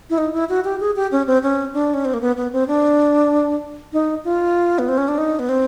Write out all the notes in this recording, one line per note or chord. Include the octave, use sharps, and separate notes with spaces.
E4
D#4
E4
F#4
G4
G#4
G4
C#4
C4
C#4
D4
C#4
C4
A#3
B3
B3
C4
D4
D#4
F4
B3
C4
C#4
D4
D#4
B3
C4